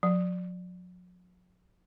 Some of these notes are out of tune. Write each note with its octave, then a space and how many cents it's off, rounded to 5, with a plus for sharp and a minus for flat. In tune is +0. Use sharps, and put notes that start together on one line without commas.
F#3 -45